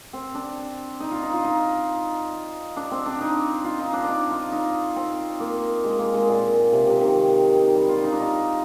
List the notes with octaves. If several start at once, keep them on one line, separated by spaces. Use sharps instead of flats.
C4
D4
D#4
F4
D#4
F4
D#4
D4
C4
D4
D#4
F4
D#4
D4
D4 D#4
F4
D#4
C4
A#3
G#3
A#3
G#3
A#2
C3
C3
D#3
D#4
G3
F4
D#4
D4
D#4